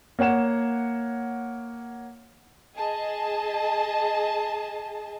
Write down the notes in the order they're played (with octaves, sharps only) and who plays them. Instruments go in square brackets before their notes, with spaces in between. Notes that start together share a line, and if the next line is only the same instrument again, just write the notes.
[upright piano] A#3 C#5 F#5 E7
[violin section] G#4 D#5 A5